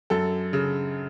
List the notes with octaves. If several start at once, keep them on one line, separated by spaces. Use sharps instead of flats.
F#2 A4
C#3